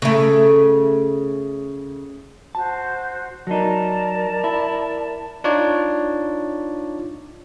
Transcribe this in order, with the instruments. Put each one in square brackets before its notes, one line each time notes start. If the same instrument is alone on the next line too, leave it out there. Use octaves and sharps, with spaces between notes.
[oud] C#3 A3
[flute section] F#4 C5 [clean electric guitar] A5
[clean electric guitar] F#3 D#4 [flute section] A#4 D5 A5
[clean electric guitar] E4
[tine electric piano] D4 D#4 F4 C#5 D5